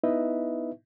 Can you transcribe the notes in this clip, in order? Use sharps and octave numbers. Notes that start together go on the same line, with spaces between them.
B3 D#4 E4 B4 D#5 E5